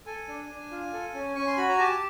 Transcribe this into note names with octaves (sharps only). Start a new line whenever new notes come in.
A4 G#5
D4
D4
F4
A4
C#4
C#4 C#6
C6
F#4 B5
A#5
G4 A5